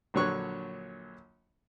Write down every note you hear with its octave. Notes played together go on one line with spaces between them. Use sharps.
A#1 D3 F#3 C#5 C#6 F#6